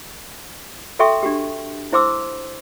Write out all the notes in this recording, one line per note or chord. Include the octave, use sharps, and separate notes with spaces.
F#4 A4 E5 G5 C6 C#6
D4 F#4 G4
E4 C5 C6 D6 E6